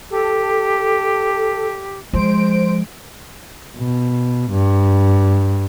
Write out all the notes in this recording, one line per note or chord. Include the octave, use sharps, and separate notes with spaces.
G4 A4
F3 G#3 C5 D7
B2
G2